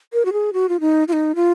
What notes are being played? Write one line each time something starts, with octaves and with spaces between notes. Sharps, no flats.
A#4
F#4
G#4
F#4
F4
D#4
F4
D#4
F4